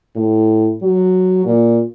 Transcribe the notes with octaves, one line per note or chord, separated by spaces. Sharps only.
A2
F#3
A#2